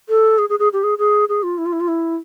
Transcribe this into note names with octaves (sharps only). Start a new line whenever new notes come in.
A4
G#4
G#4
G#4
G4
G#4
G#4
G#4
F4
E4
F4
E4
F4
E4